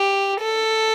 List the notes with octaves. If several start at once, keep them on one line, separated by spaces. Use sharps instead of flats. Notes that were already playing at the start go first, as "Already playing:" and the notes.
Already playing: G4
A4